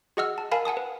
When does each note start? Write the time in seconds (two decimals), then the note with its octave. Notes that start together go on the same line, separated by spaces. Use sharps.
0.17 F#4 G#4 D#5 F#5 E6 F6
0.38 A5
0.52 A#4 F5 G#5 A5 B5
0.65 F#5 G#5 A5 D#6
0.77 B4